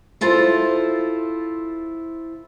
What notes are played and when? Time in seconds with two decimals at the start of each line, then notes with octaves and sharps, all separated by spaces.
0.21 E4 F4 A4 C5